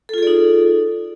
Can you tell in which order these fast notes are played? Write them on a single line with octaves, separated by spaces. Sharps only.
A4 F4 G#4 D5 D#4